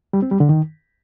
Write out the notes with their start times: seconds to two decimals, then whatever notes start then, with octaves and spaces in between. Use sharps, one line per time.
0.13 G3
0.22 C4
0.31 G3
0.40 D3
0.49 D#3